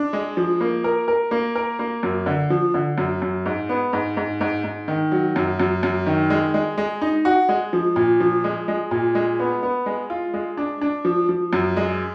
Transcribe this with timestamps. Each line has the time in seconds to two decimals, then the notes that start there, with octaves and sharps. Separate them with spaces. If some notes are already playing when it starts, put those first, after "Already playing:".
Already playing: D4
0.13 G#3
0.37 F3
0.61 A#3
0.84 A#4
1.08 A#4
1.31 A#3
1.55 A#4
1.79 A#3
2.03 F#2
2.26 D3
2.50 F3
2.74 D3
2.98 F#2
3.22 F#2
3.46 G#2
3.69 B3
3.93 G#2
4.17 G#2
4.41 G#2
4.64 G#2
4.88 D#3
5.12 F#3
5.36 F#2
5.59 F#2
5.83 F#2
6.06 D#3
6.30 G#3
6.54 G#3
6.78 G#3
7.02 D#4
7.25 F#4
7.49 G#3
7.73 F3
7.96 A#2
8.20 F3
8.44 G#3
8.68 G#3
8.91 A#2
9.15 G#3
9.39 B3
9.63 B3
9.86 G#3
10.10 F4
10.34 G#3
10.57 D4
10.81 D4
11.05 F3
11.29 F3
11.53 F#2
11.77 G#3